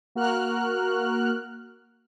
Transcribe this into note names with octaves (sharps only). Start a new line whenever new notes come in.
A#3 F#4 A#4 F6 F#6